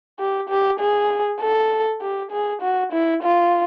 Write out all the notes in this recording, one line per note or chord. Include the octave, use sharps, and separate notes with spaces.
G4
G4
G#4
A4
G4
G#4
F#4
E4
F4